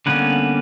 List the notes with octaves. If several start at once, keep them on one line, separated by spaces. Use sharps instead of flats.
D3 G3 A#3 B3 C#4 B4